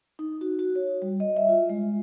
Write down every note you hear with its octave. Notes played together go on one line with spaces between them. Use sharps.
D#4
F#4
F#4
C#5
G3
D#5
E5
F4
G#3